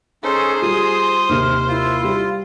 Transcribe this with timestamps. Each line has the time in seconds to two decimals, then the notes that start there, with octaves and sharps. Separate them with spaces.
0.24 C#4 D#4 G#4 A4 C5
0.62 G3 F4 D#6
1.29 D#2 C3 F6
1.68 E4 F4
2.03 G3